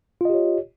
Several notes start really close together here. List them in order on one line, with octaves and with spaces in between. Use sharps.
F4 D#5 G4 C#5